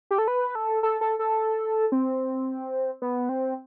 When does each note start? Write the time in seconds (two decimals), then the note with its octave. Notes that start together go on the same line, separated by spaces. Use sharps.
0.11 G4
0.18 A4
0.28 B4
0.55 A4
0.83 A4
1.01 A4
1.19 A4
1.92 C4
3.02 B3
3.29 C4